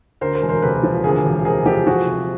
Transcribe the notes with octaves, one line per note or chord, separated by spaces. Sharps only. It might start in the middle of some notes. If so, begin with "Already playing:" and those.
D2 A#4 C5
A#4 C5
E1
A#4 C5
C3 A4 B4
F3
D2 G#4 A#4
E1
C3 G#4 A#4
F3 G4 A4
F3 F#4 G#4
C3